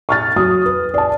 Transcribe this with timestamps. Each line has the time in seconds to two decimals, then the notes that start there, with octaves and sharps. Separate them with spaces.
0.09 C#6 F6 A6
0.36 F#3 D#6
0.66 B4
0.94 D5 A5